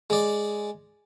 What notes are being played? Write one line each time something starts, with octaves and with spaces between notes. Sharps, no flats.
G#3 D5